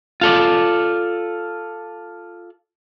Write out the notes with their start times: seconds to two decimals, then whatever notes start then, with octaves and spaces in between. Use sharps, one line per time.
0.21 F4 A4 D5